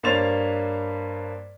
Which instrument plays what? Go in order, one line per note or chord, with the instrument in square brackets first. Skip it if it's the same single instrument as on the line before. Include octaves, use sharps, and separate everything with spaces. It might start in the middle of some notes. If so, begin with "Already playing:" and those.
[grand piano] G2 A#3 C5 C#5 A6 F7